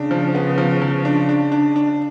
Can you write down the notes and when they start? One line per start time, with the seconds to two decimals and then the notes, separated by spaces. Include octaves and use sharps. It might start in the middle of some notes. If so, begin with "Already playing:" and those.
Already playing: C#3 D4
0.11 F3
0.35 B3
0.58 F3
0.82 F3
1.05 D4
1.29 D4
1.52 D4
1.76 D4